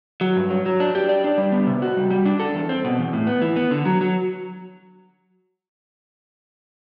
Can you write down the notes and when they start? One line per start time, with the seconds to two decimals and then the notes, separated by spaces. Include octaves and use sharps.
0.21 F#3
0.36 G2
0.50 F#3
0.66 F#3
0.80 D4
0.95 G4
1.09 D5
1.24 D4
1.38 G3
1.52 B3
1.67 C3
1.82 F#4
1.97 G3
2.11 G3
2.25 D4
2.40 A4
2.55 E2
2.69 C4
2.84 B2
2.99 E2
3.13 A2
3.27 B3
3.41 E3
3.56 B3
3.71 D3
3.85 F#3
4.01 F#3